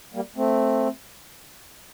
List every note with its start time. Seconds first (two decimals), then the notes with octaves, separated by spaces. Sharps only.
0.14 G3 A#3
0.36 A3 C4